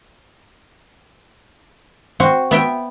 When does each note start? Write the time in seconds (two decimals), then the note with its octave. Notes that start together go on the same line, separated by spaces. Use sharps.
2.20 C4 F#4
2.51 B3 E5 G5